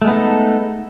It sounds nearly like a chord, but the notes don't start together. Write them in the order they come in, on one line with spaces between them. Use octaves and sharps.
A3 G#3 B3 D#4 A4